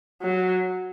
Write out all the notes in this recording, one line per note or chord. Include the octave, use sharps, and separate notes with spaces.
F#3